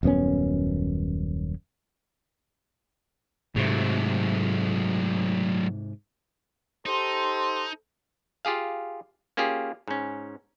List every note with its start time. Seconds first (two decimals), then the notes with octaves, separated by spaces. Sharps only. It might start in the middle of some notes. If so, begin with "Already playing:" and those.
0.03 D#1 F#2 B3 C#4
3.56 G#2 C3 F#3 A3
6.86 D#4 G4 A4 C5 C6
8.45 F4 G4 G#4 F5
9.37 A#3 C#4 F4 G4 G#4
9.88 G#2 C#4